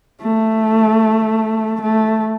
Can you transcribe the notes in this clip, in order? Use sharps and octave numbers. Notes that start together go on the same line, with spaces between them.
A3
A3